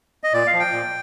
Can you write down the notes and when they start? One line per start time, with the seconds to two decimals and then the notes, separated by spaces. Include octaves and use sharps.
0.24 D#5
0.33 A#2 D5
0.47 F5
0.53 F3
0.59 G5
0.72 A#2